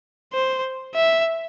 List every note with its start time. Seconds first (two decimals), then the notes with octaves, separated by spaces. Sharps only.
0.33 C5
0.95 E5